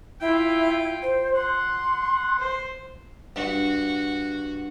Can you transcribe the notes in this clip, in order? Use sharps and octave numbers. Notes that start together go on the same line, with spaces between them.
E4 F4 G5
C5
F#5 C6
C5
G2 F#4